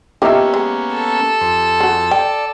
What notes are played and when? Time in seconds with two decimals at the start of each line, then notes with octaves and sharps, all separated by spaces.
0.22 D#3 F3 A#3 B3 C#4 G4 A#4 E5
0.54 G#3
0.94 A4
1.41 F2 C5
1.80 F#4 G#4
2.11 D5 G5